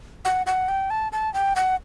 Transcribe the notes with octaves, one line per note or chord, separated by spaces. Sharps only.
F#5
F#5
G5
A5
A5
G5
F#5